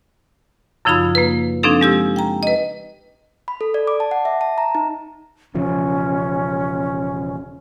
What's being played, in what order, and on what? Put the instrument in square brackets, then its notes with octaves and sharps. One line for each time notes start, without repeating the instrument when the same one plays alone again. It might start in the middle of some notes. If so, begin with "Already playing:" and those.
[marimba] F#2 C#3 F3 D#4 F4 B5
A#3 B4
F3 C4 D4 D#4 A4
G#3 G4 E6
G5 A#5
B4 D#5
[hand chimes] B5
A4
D5
D6
A5
F#5
E5
A5
A#5
D#4
[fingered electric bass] E1 C#3 F3 [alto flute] C#4